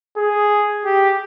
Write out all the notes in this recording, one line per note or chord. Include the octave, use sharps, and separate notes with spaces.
G#4
G4